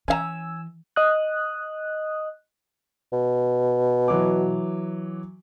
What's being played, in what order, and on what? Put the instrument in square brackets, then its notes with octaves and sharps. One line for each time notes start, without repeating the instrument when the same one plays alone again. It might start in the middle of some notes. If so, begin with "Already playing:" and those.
[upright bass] E3 [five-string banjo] C#4 F5 A#5 [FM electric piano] G#5 E6
[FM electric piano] D#5 D#6 F#6
[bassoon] B2
[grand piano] E3 F#3 D6